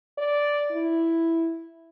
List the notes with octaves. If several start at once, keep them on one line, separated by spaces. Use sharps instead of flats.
D5
E4